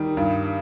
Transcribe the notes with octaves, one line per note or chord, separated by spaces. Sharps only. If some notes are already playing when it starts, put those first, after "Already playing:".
Already playing: D#3 G3
G2